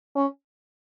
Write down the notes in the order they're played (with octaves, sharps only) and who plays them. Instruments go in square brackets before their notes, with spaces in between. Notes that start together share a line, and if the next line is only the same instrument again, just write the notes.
[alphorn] C#4